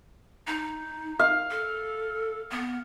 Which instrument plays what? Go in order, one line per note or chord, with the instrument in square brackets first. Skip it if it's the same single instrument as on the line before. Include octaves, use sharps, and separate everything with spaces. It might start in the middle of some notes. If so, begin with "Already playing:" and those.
[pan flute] D#4
[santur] F5
[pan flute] A4
B3